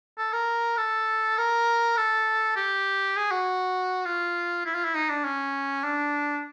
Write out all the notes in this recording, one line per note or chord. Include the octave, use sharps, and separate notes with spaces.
A4
A#4
A4
A#4
A4
G4
G#4
F#4
F4
E4
F4
E4
D#4
D4
C#4
D4